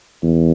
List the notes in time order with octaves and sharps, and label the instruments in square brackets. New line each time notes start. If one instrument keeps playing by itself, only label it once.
[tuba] E2